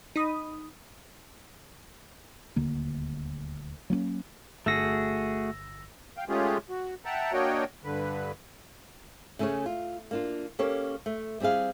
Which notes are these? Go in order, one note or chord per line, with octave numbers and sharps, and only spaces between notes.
D#4 B5 D#6
D#1 D2 D3 A#3
F#3 A#3 C4 C#4
G1 A3 F#4 G#4 E6 A#6
F5 G5
G#3 A3 C#4 F4 G4 G#4
F#4
E5 F#5 G5 A5 A#5
A#3 D4 F#4 C#5 D#5 G5
G2 D3 B4
C#3 A3 C#4 G#4 C#5
F4
A#3 D4 F4
A#3 C#4 G4 A4 C#5
A3
G3 C4 E4 G#4 F5